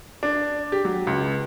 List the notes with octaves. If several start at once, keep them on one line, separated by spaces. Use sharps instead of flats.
D4
G4
F#3
C#2